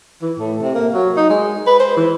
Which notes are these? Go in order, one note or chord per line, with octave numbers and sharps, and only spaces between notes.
E3
A2
C3
A#3
F#3
D#4
G#3
B4
C5
E3